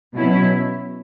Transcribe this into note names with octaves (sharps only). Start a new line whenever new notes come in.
B2 F#3 C#4 E4